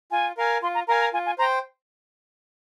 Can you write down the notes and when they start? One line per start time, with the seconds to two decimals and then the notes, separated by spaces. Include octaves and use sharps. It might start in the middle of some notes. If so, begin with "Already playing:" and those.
0.11 F4 G#5
0.37 A#4 F5 G#5
0.62 F4 C6
0.75 A#5
0.88 A#4 F5 G#5 A#5
1.01 A#5
1.13 F4 G#5
1.26 G#5
1.39 C5 A#5
1.42 G5